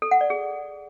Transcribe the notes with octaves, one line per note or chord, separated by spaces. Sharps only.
A4
F#5
D5
G#4